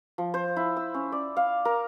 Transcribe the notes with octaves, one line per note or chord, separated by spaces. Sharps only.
F3
C5
E4
E6
C#4
D5
F5
A#4